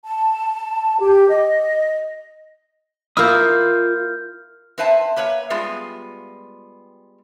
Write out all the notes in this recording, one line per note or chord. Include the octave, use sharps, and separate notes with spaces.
A5
G4
D#5
A#3 E4 F4 D#6 F6 G6
C4 B4 C5 E5 G#5 A5
A#3 B4 C#5 E5
G3 G#3 B3 F4